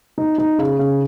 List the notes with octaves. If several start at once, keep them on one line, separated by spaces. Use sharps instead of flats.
D#4
D#4
C#3
C#3